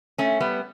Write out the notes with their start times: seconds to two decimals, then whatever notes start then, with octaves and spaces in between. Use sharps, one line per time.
0.18 A3 C#4
0.40 G3 B3